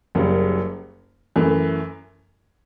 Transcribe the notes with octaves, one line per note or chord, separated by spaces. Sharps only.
F#1 F#2 C#3 G3
F#2 E3 A3